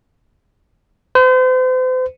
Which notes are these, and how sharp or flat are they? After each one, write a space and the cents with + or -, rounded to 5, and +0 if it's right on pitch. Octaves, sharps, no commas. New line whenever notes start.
C5 -40